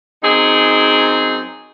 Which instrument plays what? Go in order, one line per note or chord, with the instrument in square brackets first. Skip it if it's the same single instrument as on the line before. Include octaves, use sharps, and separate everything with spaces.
[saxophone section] F#2 C4 D#4 G#4